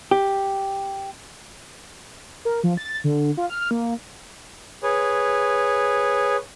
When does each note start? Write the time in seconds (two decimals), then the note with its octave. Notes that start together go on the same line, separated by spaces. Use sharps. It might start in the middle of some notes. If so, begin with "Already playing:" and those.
0.11 G4
2.45 A#4
2.64 F3
2.77 A6
3.04 D3
3.37 F4
3.50 F6
3.71 A#3
4.83 G#4 B4 C#5